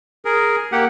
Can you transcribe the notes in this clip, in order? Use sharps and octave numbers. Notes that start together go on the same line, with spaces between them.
G#4 A#4
A#3 G4 F#5